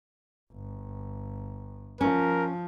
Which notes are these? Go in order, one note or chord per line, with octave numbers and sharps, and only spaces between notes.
G1
F3 C#4 A#4